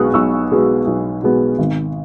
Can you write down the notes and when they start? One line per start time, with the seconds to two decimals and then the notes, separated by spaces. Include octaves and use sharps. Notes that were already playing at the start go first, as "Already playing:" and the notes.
Already playing: B1 B2 G#3 B3 C#6 D#6 F#6
0.14 B1 C#6 E6
0.51 B2 G#3 B3
0.87 B1
1.22 B2 G#3 B3
1.59 G#1